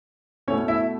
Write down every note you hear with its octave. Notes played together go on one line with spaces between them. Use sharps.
B2 A3 C#4 E4 C#5
E4 E5